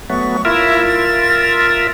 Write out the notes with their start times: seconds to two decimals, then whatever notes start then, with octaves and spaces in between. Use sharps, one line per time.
0.10 F#3 A3 B3 C#6
0.45 E4 F4 A#4 E5
0.88 A6